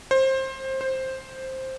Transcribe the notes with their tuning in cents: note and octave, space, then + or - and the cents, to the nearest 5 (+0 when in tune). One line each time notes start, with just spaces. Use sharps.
C5 +20
C5 +5